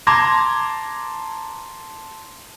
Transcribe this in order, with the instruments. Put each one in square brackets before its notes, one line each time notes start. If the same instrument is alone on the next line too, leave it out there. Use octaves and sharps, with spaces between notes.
[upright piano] A5 A#5 C6 D6 G#6 A#6